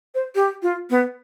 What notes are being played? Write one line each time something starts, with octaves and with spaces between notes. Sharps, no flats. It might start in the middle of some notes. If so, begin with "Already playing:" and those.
C5
G4
F4
B3